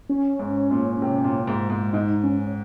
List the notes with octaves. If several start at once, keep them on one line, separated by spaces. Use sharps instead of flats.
C#4
G#2
A#2
C3
A#2
G#2
G#2
G#2 D#4
C#4